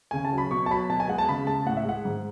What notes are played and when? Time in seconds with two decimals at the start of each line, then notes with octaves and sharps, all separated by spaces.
0.11 C#3 G#5
0.25 A5
0.33 F#3
0.38 B5
0.51 B2 C#6
0.66 A5
0.70 F#3 B5
0.89 B2 A5
1.00 G#5
1.08 G#3 F#5
1.18 A5
1.28 C#3 B5
1.47 G#3 A5
1.66 A2 F#5
1.77 E5
1.85 G#3 F#5
2.05 G#2